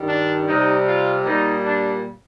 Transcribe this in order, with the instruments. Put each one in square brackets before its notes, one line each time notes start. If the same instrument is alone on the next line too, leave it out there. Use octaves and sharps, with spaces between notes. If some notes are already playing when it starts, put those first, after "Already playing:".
Already playing: [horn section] G2 D#3 G3
D4
C3 G3 D#4
F4
A#2 G3 D#4
D4